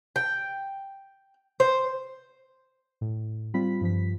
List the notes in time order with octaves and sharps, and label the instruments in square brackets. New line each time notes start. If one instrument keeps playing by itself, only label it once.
[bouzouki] G5
C5
[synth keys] A2
G3 C4 F4 B5 B6
G2 F3 B6